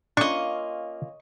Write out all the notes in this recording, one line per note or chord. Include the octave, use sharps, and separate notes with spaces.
A#3 C#4 D4 F4 D#5 C#6